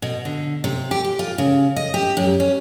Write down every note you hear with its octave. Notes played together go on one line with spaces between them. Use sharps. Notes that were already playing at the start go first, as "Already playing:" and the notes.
B2
D3
C3
G4
G4
F4
C#3
D#5
G4
F#2
C#4